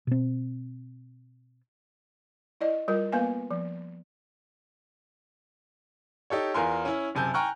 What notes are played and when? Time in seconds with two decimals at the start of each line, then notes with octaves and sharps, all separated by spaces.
0.07 B2 C4
2.61 E4 D5 D#5
2.88 G3 F4 A#4
3.12 A#3 B3 B4 F5 G#5
3.51 F3
6.30 D#4 G4 A4 C#5
6.54 E2 F4 A#4 G#5 C6 F6
6.85 C#4 E4
7.15 F#1 C3 G#5 A5 G6
7.34 G5 G#5 A#5 C#6 F6 F#6